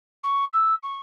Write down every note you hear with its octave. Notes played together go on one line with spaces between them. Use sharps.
C#6
E6
C#6